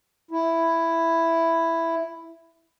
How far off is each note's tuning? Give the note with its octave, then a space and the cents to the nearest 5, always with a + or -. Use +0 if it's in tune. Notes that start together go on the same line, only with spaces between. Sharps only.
E4 +5